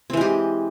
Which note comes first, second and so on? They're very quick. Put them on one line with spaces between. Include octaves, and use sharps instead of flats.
C4 E3 G#3 G4